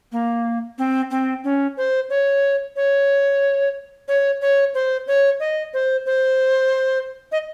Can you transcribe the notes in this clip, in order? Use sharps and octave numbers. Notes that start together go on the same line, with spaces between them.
A#3
C4
C4
C#4
C5
C#5
C#5
C#5
C#5
C5
C#5
D#5
C5
C5
D#5